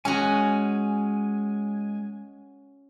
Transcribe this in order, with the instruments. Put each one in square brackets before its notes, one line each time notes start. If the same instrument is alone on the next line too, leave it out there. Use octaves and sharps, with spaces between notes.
[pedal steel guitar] G#3 G#5 [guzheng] C#4 F#4